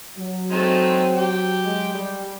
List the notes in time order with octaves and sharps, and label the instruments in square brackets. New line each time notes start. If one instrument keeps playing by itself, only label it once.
[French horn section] F#3
[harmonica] G#3 A3 D#4 [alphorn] C4
[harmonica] G4 G5
[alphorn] G#3
G3